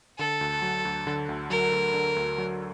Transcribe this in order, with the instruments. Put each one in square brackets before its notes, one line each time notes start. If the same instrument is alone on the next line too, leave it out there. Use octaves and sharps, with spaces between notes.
[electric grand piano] D3 [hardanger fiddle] A4
[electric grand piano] D2
F#3
D2
D3
D2
[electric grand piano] F#3 [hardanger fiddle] A#4
[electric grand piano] D2
D3
D2
F#3